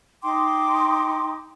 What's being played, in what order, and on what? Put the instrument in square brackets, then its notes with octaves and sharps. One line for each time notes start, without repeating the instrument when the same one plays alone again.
[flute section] D#4 G5 C6 D6